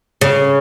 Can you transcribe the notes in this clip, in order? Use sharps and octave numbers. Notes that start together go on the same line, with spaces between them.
C#3